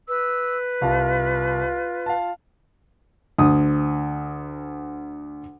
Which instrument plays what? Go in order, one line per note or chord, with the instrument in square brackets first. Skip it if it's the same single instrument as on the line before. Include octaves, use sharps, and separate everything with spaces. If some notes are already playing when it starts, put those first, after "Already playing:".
[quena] B4 [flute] E6
[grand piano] C2 F5 A5 [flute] F4
[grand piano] F5 A5
[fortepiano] D2 D#6